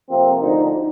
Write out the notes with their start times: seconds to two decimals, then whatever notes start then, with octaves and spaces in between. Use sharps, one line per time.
0.09 F2 C3 F3 A#3 C4
0.40 D2 D3 F3 D#4